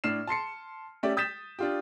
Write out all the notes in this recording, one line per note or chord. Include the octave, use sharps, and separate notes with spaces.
A2 D4 F6 C7 E7
A5 C6 C7 C#7
A3 C#4 G4 D5 E5
D#6 G6 A6 B6 E7
D4 F4 G4